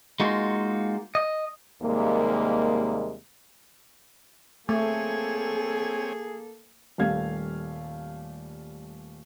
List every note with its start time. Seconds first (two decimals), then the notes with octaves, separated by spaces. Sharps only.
0.20 G#3 A#3 D#4 F4 F#4
1.15 D#5
1.83 D#2 C3 G3 G#3 A#3
4.69 A3 A#3 C4 G#4 A4 C#5 G#5
6.98 D#1 G3 A3 F5 G#6